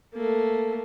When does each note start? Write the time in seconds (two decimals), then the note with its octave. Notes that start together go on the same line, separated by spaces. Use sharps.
0.15 A3 A#3